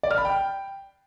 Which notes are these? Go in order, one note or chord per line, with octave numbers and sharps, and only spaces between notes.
D5
F6
B5
G5